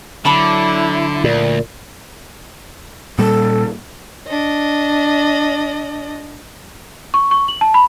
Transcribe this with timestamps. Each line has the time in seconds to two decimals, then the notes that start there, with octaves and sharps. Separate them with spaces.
0.25 D3 F#3 E4 A5 B5 D6
1.24 D2 A#2
3.19 A#2 G3 A4
4.28 D4 D#5
7.14 C#6
7.31 C#6
7.48 F#7
7.61 A5
7.74 B5